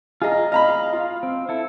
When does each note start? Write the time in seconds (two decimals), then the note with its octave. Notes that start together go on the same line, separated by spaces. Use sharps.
0.22 F4 G#4 D#5 A#5
0.52 D#5 F5 A#5 B5
0.93 F4
1.23 C4
1.49 E4 A4